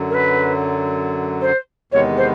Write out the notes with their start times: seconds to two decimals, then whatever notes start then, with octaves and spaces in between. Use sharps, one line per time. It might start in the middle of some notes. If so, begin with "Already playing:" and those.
Already playing: F#2 D3 F#3
0.10 A#4
0.14 B4
1.42 C5
1.92 E2 C3 D#3 G#3 B3 C#5
2.17 C5